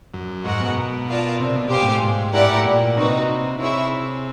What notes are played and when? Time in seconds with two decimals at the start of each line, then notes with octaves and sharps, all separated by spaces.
0.14 F#2
0.45 G#2 F#4 A#4 D#5 F#5
0.61 B2
1.08 F4 A#4 D5 F5 A5
1.40 C3
1.55 B2
1.70 B2 G4 C5 F5 G#5
1.82 G#2
1.86 A2
2.02 G#2
2.33 G#2 E4 G4 A#4 D5 F#5
2.50 A2
2.65 A#2
2.97 C3 D#4 F#4 B4
3.59 C3 E4 G#4 C#5 E5